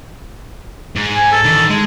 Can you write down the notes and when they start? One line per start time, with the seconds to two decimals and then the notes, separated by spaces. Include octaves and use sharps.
0.96 G#2
1.16 G#5
1.32 A4
1.45 D#3 E3
1.70 G#3